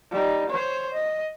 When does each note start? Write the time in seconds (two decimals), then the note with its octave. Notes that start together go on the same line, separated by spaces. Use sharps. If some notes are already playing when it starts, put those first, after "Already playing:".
0.11 G3 D#4
0.50 C5 C#5
0.93 D#5